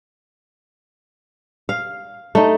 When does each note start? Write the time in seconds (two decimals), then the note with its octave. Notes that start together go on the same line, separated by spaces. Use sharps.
1.69 F5
2.35 A3 D#4